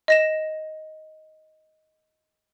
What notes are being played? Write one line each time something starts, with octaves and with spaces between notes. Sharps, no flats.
D#5 A#6 E7